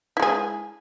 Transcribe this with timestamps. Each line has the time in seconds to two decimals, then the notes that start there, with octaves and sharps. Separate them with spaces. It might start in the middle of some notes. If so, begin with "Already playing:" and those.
0.17 E4
0.20 G#3
0.22 G#4